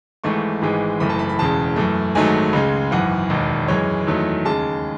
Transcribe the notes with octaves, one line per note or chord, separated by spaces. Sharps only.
G#1 G#2 E3 A3 C#6
G#1 G#2 E3 G#3
F#1 F#2 E3 A3 B5
A5
B5
B5
E1 E2 C#3 A5
F#2 E3 A3
G#1 G#2 D#3 F#3 A3 G#5
C#2 C#3 G#3
G#1 F#2 E3 F#5
E1 D#2 D#3
F#2 E3 G#3 C#5
E2 D#3 F#3 A3
D#2 C#3 G#3 A5